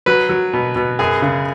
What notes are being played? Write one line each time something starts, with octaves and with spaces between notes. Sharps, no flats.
F#3 B4
F#3
B2
B2
F#2 G#4
C#3